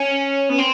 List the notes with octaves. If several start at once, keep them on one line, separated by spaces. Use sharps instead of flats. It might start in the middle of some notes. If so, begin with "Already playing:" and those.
Already playing: C#4
B3
C4